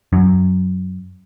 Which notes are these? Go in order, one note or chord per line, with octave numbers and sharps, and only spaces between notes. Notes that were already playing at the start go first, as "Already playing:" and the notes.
F#2